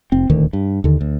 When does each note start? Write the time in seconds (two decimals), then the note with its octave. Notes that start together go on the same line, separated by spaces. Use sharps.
0.12 F1 C4
0.29 D#1 D2 D#3
0.53 G2
0.84 D#2 D3
1.01 D2